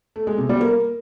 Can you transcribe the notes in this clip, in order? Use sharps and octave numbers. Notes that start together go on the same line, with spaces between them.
A3
G#3
C3
G3
A#3